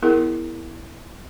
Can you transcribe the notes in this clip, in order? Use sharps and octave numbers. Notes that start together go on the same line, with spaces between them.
B3 E4 G#4 A#4